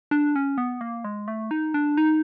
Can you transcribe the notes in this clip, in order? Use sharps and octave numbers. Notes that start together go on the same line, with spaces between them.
D4
C#4
B3
A#3
G#3
A3
D#4
D4
D#4